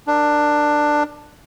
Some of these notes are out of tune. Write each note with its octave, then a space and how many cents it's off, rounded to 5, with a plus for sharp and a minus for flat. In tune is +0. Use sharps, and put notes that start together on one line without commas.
D4 +15 A#4 +0